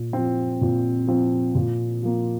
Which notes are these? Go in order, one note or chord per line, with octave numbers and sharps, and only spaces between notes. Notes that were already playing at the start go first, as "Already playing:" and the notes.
Already playing: A#2
F3 C4
A#2
F3 C4
A#2
F3 A#3